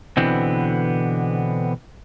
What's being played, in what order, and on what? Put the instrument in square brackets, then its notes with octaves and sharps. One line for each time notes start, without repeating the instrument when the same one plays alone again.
[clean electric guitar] B2 D3 E3 B3 C4